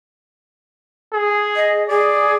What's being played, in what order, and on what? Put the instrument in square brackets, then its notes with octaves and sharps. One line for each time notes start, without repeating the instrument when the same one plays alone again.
[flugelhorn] G#4
[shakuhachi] D#5
[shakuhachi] G#4 [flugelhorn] D5